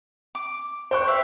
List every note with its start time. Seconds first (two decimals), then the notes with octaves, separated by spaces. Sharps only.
0.35 D6
0.91 C5 G5 C#6 F6 F#6
1.08 B4 E5 F5